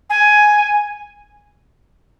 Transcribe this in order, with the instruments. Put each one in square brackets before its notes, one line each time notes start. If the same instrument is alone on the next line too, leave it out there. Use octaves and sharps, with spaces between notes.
[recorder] G#5